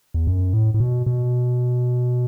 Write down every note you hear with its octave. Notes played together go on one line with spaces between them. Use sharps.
E2
F#2
A2
A2
B2
B2